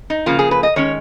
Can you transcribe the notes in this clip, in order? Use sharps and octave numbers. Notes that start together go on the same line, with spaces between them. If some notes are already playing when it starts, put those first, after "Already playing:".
D#4
C#3 F3 A#3 F4
G#4
B4
D#5
D#3 G#3 C#4 C#5